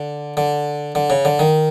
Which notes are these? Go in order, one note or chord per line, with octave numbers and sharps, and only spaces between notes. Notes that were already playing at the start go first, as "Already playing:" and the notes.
Already playing: D3
D3
D3
C#3
D3
D#3